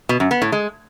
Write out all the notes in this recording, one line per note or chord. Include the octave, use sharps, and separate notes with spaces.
B2
F#2
B3
A2
G#3